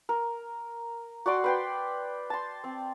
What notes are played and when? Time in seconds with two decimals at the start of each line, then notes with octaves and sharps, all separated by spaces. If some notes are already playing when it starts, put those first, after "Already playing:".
0.09 A#4
1.26 F#4 D5 C6 D6
1.44 B4 G5 C6
2.30 A5 C6
2.64 C4